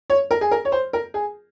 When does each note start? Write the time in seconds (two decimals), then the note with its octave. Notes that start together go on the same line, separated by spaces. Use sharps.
0.10 C#5
0.31 A#4
0.41 G#4
0.51 A#4
0.65 C#5
0.72 C5
0.93 A#4
1.14 G#4